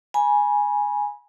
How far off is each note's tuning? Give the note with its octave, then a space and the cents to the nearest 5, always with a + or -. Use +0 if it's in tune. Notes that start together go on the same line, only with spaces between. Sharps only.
G#5 +0 B5 -35